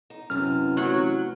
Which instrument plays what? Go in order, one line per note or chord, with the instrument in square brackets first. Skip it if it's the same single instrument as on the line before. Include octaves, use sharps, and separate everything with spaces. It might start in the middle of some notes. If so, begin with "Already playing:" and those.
[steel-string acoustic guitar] D#4
[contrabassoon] F#2 [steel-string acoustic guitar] C3 E3 B3 [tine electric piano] F6
[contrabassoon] A1 [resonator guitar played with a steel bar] F#3